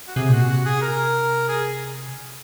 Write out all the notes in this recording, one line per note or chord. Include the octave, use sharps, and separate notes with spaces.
F#4
C3 G#4
A#2 F#4
C3
F#4
G#4
A#4
G#4